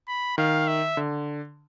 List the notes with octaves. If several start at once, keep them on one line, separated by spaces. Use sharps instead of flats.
B5
D#3 F5
E5
D3